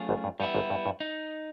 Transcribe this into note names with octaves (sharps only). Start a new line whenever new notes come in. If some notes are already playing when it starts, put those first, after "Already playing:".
Already playing: F#3 A3 C#4 F4 G#4
G#1 G#2
G2
G2 G3 B3 E4
G#1 G#2
G2
G2
D#4